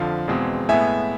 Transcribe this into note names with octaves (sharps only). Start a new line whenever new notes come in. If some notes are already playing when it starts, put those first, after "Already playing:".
Already playing: F2 D3 F3 F5
E2 B2 G#3 C4
A2 G#3 B3 E5 G#5